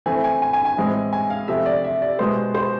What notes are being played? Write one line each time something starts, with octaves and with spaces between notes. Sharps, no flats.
E3 A3 C4 G#5
G#5
G#5
G#5
G#5
A2 E3 G#3 C4
G#5
F5
C3 F3 A3 E5
D5
E5
D5
B2 G#3 B3 C5
C5